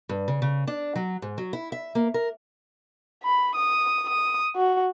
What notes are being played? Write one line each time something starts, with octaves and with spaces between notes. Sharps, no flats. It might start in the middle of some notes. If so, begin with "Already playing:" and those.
G2
C#3
C#3
D4
F#3
G#2
F#3
E4
E5
A#3
A#4
B5
D#6
D#6
F#4